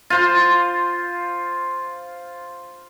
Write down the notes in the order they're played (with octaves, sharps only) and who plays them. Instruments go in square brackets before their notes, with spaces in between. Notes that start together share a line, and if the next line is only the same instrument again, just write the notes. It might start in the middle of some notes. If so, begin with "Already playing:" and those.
[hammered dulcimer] F4 C5 C6